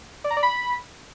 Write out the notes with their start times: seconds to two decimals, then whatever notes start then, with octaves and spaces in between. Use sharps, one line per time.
0.24 D5
0.31 A#5
0.37 D5
0.43 B5